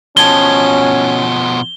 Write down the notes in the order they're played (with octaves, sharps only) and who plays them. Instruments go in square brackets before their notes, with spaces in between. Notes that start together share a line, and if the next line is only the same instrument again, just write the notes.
[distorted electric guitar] B2 F3 [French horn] C#4 [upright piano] A5 G#6 [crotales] G7